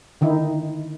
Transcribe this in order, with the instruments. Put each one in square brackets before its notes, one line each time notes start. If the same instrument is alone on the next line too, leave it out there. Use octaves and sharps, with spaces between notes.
[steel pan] D3 D#3 D#4 E4